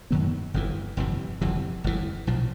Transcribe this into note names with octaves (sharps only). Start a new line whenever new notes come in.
F#2 D#3 F#3 B3
G1 F2 C3 E3
G1 F2 C3 E3
G1 F2 C3 E3
G1 F2 C3 E3
B1 A#2 F3